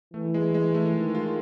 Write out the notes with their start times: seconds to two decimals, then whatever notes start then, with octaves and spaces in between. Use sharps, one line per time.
0.14 E3 A3
0.34 G#3
0.54 G#3
0.74 A3
0.95 D#3
1.15 F4